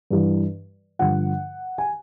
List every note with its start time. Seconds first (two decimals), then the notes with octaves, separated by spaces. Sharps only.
0.10 G2 E3
0.99 G2 D3 F3 F#5
1.78 G#5